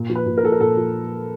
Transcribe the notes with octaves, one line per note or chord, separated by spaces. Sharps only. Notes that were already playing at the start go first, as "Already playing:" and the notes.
Already playing: A#2
F3
B4
A#2
A#4
F3 A4
A#4
A#2 A4
F3